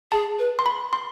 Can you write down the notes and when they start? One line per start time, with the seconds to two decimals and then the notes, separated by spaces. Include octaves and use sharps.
0.12 G#4 A5
0.39 B4
0.59 C6
0.66 B5
0.93 C6